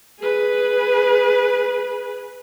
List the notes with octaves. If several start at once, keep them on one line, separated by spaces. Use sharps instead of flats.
G#4 B4